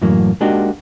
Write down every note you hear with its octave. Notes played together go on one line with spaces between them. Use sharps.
F#2 A2 E3 F#3 A#3
G#3 A#3 D4 D#4 F#4 G4